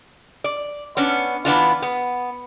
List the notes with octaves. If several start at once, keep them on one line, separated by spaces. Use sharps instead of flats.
D5
B3 C#4 D4
E3 B3 D4 F4
B3